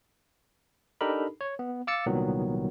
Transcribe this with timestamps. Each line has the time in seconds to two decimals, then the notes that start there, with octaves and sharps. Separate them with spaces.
1.01 D4 D#4 G4 A4 A#4 B5
1.41 C#5
1.59 B3
1.87 F5 D6 E6 A6 C#7
2.06 C2 A#2 D#3 F#3 B3